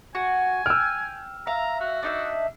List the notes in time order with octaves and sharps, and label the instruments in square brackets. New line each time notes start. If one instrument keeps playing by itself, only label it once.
[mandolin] F#4 [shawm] G#5
[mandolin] G5 [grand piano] E6 F6
[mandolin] E5 F5 [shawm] A#5
[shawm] F#4
[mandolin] D4 D#4 E5